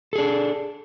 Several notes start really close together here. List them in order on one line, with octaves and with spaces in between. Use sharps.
A4 G#4 D4